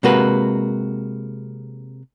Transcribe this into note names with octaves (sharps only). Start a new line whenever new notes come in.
C3 G#3 A#3 F#4 B4